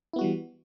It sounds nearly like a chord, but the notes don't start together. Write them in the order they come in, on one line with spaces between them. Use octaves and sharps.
E4 B3 F#4 G3 E3